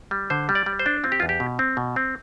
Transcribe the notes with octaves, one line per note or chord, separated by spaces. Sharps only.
G3
D3 C5
G3
D5
G3
C5
D4
C4 F4
G4
F4
E2
G4
B2
C4
B2
C4